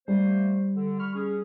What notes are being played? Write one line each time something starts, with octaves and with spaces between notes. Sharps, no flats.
G3 A3 A#3 C5
D3
B5 C#6 F6
C#4 G#4